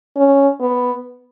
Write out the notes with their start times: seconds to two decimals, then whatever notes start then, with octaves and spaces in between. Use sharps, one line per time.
0.16 C#4
0.61 B3